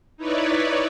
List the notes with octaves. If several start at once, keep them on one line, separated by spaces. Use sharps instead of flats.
D#4 E4 B4 C#5 D5